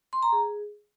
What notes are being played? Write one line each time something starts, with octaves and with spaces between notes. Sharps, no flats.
C6
A#5
G#4